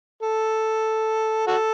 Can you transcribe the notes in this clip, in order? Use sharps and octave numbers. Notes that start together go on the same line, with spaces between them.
A4
F#4 A4